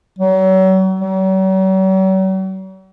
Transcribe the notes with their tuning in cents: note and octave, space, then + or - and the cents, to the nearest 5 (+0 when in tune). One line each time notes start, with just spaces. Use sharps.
F#3 +35
F#3 +45